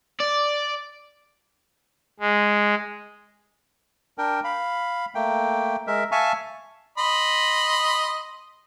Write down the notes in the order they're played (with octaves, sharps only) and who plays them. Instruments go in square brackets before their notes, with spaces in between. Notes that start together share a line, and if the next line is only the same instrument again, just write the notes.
[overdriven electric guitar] D5
[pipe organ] G#3
[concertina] D4 A#4 G5
F5 B5
A3 A#3 G5
G#3 A#4 E5
E5 F5 G#5 A5 C#6
[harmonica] D#5 B5 C6